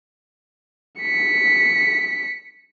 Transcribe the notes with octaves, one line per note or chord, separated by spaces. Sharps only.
B6 C#7